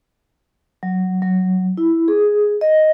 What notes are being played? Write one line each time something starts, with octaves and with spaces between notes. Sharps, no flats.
F#3
F#3
E4
G#4
D#5